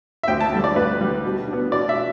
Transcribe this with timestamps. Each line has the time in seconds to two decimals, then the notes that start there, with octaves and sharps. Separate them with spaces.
0.23 E5
0.28 D2 G5
0.41 A5
0.52 D3 G3
0.64 D5
0.76 D2 B4
1.01 D3 G3
1.25 B2
1.48 B3 D4
1.72 B2 D5
1.89 E5